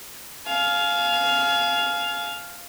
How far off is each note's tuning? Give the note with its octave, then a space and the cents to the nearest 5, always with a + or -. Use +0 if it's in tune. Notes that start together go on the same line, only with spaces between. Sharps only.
F5 +0 G#5 +40